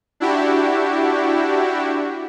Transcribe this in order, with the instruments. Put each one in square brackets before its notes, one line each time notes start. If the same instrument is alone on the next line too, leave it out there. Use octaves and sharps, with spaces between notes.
[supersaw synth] D4 E4 F#4 G4